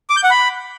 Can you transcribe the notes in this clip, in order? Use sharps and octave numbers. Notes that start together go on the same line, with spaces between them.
D6
G6
F#5
B5